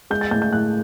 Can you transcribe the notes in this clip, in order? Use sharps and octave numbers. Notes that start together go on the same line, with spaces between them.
G#3 G6
A6
A2 G6
G6
A2 F#6